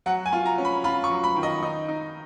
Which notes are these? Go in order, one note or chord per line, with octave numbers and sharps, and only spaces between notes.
F#3 F#5
G#5
F4
A#5
C#4
B5
F4 B5
C#6
F#3
B5
D#3
D#5
D#4 D#5
D#4